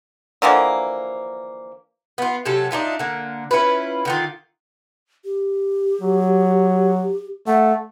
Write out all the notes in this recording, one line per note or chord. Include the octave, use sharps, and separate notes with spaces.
D3 E3 F3 A#3
B3 F4
C3 F#3 C#4 A4
D4 D#4 F4 E5
D3 A#3
C#4 E4 F4 B4
D3 D#3 F4
G4
F#3
A3 F#5